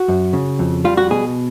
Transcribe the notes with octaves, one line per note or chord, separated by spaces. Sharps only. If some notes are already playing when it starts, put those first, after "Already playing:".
Already playing: F#4
F#2
C#3
F2
G3 F4
F#4
B2 G#4